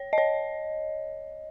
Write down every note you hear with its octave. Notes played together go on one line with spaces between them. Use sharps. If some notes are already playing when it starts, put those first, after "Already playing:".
Already playing: C#5
D#5
C#5